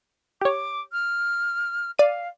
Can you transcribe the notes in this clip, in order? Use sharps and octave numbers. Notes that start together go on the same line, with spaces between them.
G4 C#5 D6
F6
D5 F5 D#7